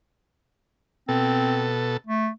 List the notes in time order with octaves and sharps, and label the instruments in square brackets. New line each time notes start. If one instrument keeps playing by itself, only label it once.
[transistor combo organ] B2 A4 [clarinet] C4
[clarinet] A3